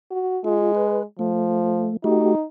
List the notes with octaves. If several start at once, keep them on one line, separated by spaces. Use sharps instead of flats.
F#4
G#3 F4
B4
F3 A3
A3 D#4 F#4 G4